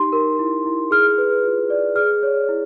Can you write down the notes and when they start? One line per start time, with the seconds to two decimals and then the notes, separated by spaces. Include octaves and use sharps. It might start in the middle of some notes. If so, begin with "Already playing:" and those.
Already playing: D#4 G4 C6
0.12 A#4
0.39 E4
0.66 E4
0.91 G#4 F6
1.18 B4
1.44 F4
1.70 D5
1.96 G#4 F6
2.23 C#5
2.49 E4